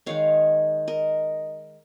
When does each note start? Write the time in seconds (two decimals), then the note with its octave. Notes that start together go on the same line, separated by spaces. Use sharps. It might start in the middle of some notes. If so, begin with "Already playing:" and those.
0.06 D#3 G#3 D#4 C#5 F5
0.88 A#4 D#5